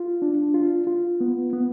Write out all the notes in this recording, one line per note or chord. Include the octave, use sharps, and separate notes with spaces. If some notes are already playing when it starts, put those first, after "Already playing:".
Already playing: F4
D4
F4
F4
B3
B3